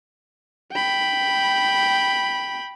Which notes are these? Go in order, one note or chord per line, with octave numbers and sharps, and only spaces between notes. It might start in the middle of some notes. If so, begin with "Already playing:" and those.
G5 B5